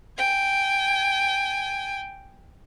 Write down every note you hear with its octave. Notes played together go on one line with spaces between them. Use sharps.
G5 G#5